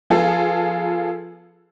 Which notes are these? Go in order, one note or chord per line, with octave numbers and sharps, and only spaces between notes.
F3 B3 F4 G#4 A4